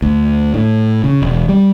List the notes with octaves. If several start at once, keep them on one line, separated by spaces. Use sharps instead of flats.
D2
A2
C#3
E1
G3